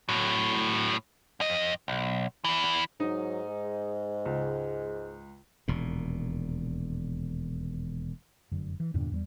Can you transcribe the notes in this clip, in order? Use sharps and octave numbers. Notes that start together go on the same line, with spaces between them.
A2 F#3
F2 D#5
B1
E2 E3
G#2 F#3 D#4
G#3
C#2
E1 D#2 A#2
F1 F#2 D3
E3
E2 G2 A#2 D3
E2 F#3 G3